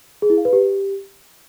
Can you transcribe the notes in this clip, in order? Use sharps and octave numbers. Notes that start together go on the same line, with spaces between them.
G#4
E4
F5
B4
G4